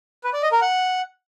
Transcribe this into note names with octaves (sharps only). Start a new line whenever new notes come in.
B4
D5
D#5
A#4
F#5